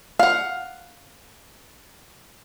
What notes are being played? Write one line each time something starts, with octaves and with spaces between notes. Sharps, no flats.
F5 F#5